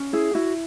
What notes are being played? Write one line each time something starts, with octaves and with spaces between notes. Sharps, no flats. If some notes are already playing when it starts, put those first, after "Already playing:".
Already playing: C#4
E4 G#4
E4 F#4